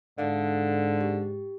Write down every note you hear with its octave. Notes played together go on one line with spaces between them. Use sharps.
G#2 D3 A4 D5 F5
G4